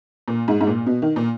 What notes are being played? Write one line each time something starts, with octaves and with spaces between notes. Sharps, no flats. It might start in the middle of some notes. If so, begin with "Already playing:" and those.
A#2
G#2
G#2
A#2
B2
D#3
A#2